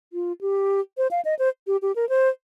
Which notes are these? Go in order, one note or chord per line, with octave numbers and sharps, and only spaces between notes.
F4
G4
C5
F5
D#5
C5
G4
G4
A#4
C5